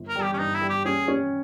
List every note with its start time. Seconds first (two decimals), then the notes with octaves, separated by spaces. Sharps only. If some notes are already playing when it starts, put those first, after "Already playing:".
Already playing: G1
0.08 A#4
0.16 G3
0.23 G4
0.33 C#4
0.39 G2 D#4
0.54 E4
0.62 G3
0.69 G4
0.85 C#4 G#4
1.08 C#4